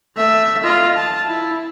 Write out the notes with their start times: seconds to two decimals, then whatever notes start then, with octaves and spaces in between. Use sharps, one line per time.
0.16 A3 E5
0.64 F4 D#5
0.95 A5
1.27 E4